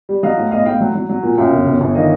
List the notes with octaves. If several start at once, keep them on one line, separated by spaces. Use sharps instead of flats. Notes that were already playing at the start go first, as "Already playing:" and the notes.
G3
F#3 D#5 F5
A2
B1 D#5 F5
A2 F5 G5
F#3
F#3
F#3
A#2
F#2 F5 G5
G1
G1
G1
D#3 D#5 F5